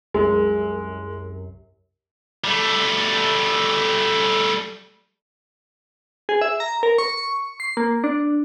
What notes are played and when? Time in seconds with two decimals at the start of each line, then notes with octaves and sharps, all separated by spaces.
0.14 C2 F#2 G#3
2.44 G3 A3
6.29 G#4
6.41 E5
6.60 A#5
6.83 A#4
6.98 C#6
7.17 C#6
7.60 C7
7.77 A#3
8.04 D4